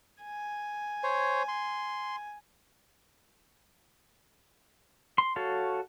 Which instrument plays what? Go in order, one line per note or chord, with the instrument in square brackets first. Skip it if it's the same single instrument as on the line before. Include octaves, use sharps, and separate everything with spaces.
[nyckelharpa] G#5
[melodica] C5 C#5
C6
[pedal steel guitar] C6
F#4 A4 C#5 F5